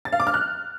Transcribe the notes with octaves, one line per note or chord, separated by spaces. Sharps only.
A6
F5
D6
F6
F#6